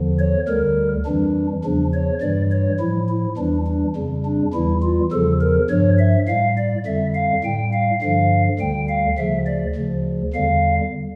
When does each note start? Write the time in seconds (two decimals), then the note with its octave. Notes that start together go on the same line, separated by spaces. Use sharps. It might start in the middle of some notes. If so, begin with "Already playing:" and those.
Already playing: E2 D3 F3
0.19 C#5
0.48 D2 D3 G3 A#4
1.06 F2 E3 G3 D4
1.64 E2 C#3 F3 D4
1.94 C#5
2.21 G2 E3 G3 D5
2.51 C#5
2.80 A2 F3 E4
3.09 E4
3.37 E2 E3 G3 D4
3.67 D4
3.96 F2 C#3 G3
4.25 D4
4.54 E2 E3 G3 E4
4.82 F4
5.12 E2 C#3 F3 A4
5.41 A#4
5.69 G2 F3 C#5
5.99 E5
6.28 A2 G3 F5
6.58 D5
6.86 F2 D3 G3 E5
7.15 F5
7.44 A2 G3 G5
7.73 F5
8.02 G2 D3 F3 F5
8.59 D2 D3 G3 G5
8.89 F5
9.18 D2 C#3 F3 E5
9.46 D5
9.76 D2 C#3 F3
10.34 E2 D3 G3 F5